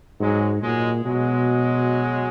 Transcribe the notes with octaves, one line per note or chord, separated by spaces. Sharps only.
G#2 F#3 G#3
A#2 F#3 G#3
B2 F#3 G#3